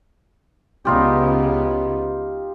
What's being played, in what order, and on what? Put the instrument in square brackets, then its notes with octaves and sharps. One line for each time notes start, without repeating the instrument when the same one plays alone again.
[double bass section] C#2 C#3 B3 [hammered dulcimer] D#4 F4 G4